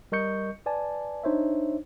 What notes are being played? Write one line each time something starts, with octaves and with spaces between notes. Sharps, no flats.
G3 A#4 D#5 C#6 G6 C#7
B4 D5 G#5 A5
D4 D#4 C5 C#5 E5